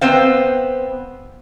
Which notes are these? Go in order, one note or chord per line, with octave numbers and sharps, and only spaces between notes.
B3 C4 C5 F5